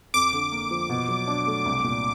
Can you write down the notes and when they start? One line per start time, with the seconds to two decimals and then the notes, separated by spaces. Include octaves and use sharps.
0.14 F2 D6
0.33 D3
0.52 A#3
0.71 F3
0.90 B2
1.09 F#3
1.27 D4
1.47 A3
1.65 C2
1.84 A#2